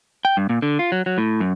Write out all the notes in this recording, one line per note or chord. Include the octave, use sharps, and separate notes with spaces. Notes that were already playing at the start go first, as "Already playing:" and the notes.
G5
G2
A#2
D3
F4
F#3
F#3
A2
F#2